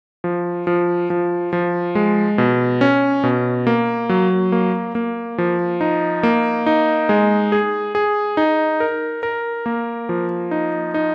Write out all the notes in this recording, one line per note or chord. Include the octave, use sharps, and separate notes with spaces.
F3
F3
F3
F3
G#3
B2
C#4
B2
A#3
F#3
A#3
A#3
F3
D#4
A#3
D#4
G#3
G#4
G#4
D#4
A#4
A#4
A#3
F3
D#4
D#4